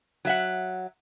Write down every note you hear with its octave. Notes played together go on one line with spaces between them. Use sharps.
F#3 E5 F#5